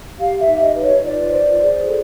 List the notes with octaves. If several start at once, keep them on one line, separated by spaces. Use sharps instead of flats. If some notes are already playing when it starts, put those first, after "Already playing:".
G4 F5
E5
D#4
D#5
B4
C#5
F4 D5
C5
G#4
A4